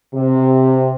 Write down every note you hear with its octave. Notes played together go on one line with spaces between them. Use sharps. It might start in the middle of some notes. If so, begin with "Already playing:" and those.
C3